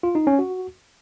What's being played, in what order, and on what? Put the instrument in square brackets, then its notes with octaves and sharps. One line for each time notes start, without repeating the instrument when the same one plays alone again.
[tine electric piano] F4
D#4
C#4
F#4